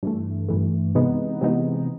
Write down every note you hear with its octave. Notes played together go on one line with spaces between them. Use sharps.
G2 E3 A3
G2 E3 A3
C3 E3 G#3 B3 D#4
C3 E3 G#3 B3 D#4